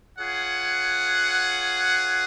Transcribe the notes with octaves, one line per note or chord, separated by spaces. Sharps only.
F4 G#4 C#5 F#5